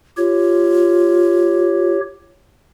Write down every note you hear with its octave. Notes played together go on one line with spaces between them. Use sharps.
F4 G4 C#5